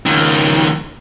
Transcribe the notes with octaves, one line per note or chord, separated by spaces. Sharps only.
C#2 D#3